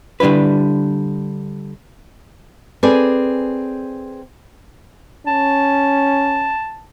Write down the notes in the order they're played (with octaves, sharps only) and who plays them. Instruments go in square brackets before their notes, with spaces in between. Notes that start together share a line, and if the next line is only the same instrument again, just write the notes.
[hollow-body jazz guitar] D3 G3 D4 E4 B4
[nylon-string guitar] C4 G#4 A4 B4 D5 G#5
[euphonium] C#4 [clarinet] A5